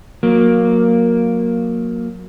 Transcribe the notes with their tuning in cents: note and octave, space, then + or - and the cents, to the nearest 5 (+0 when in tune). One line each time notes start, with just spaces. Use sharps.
F#3 -25 A#3 +0